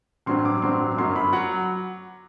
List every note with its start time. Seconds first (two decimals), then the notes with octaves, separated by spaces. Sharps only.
0.26 A1 G2 F#3 C4 C6
0.45 D6
0.62 A1 G2 F#3 C4 C6
0.98 G1 F#2 F#3 C6
1.16 B5
1.33 F#3 F#5